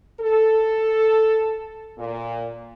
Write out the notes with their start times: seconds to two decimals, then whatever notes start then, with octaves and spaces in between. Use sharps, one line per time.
0.20 A4
1.98 A#2